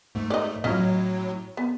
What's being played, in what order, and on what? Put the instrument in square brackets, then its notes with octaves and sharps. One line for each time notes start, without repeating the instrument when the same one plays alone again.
[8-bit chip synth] G#2 A3
[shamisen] D5 D#5
[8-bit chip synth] A2 F#3 [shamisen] C#4 F4 D#5
[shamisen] B3